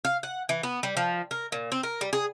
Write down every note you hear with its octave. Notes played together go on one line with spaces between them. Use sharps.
F5
F#5
E3
B3
G3
F3
A#4
A#2
C4
A#4
G3
G#4